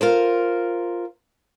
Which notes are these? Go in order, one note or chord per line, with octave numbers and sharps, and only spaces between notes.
F4 A#4 C5